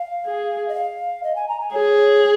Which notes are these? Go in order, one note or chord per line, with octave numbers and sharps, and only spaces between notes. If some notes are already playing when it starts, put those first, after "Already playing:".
Already playing: F5
G#4
D#5
F5
D#5
G#5
A#5
G#5
G#4 C#5
C#5